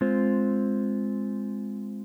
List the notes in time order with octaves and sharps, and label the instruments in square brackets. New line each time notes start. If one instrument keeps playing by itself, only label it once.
[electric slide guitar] G#3 C4 F4 C5